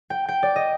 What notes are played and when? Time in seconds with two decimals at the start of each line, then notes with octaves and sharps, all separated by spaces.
0.10 G5
0.28 G5
0.43 D5
0.56 D#5